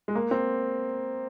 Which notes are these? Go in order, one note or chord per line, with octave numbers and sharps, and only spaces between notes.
G#3
A#3
C4